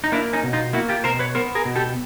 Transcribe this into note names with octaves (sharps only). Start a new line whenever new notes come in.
D#4
A#3 D4 E4
C#4 D#4
B2
D#4 F4
A#3 E4 F#4
F4 G4
B2 A#4 C5
B4 C#5
B3 A#4 C5
G#4 A#4
B2
G4 A4